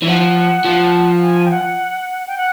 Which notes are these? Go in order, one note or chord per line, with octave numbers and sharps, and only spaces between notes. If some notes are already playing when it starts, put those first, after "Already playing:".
E3
F3 F#5
F3
G#5
G5
F#5
G5
F#5